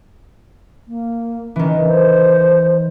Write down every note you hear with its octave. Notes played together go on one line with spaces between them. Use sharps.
A#3
D#3 E3 C#4
C5